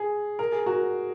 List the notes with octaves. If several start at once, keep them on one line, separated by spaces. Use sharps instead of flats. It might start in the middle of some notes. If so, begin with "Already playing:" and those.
Already playing: G#4
A#4
G#4
F#4 A#4